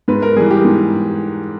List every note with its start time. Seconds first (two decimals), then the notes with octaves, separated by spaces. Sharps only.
0.08 G#2 B4
0.22 A#4
0.36 E3 G3 G#4
0.51 G4
0.64 G#2